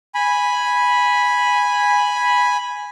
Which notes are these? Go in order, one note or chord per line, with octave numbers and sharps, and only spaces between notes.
G#5 B5